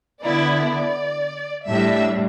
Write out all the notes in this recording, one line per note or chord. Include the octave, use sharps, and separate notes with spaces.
D3 B3 E4 D5
D5
A2 G3 D4 E5